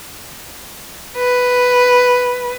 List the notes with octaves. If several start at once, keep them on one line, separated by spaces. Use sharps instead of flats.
B4